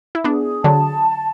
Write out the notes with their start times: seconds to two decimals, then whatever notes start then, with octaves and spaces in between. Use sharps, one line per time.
0.15 E4
0.24 B3 D4 G#4
0.64 D3 F#3 A5